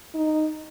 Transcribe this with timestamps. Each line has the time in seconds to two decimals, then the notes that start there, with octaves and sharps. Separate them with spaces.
0.15 D#4